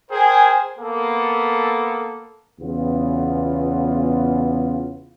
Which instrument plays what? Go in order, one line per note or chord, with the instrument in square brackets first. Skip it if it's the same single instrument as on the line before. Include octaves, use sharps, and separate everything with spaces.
[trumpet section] G#4 A#4 C5 G5 G#5
A#3 B3 A4
[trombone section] E2 C#3 B3 F4